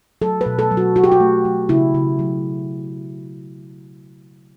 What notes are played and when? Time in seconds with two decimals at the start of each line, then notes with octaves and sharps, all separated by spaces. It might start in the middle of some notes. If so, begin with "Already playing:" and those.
0.22 F#3 A4
0.41 B4
0.46 B2
0.59 A4
0.71 F#3
0.77 F#4
0.96 F#3 F#4
1.04 G4
1.12 F#4
1.20 A3
1.45 F#3
1.69 C#3 E4
1.94 C#3
2.19 F#3